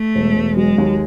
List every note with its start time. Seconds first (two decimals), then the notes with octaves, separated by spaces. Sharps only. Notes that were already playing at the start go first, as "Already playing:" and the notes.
Already playing: A3
0.15 E1
0.36 E1
0.57 F#3 G#3
0.78 D#2